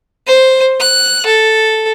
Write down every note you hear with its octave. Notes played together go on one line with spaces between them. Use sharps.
C5
F#6
A4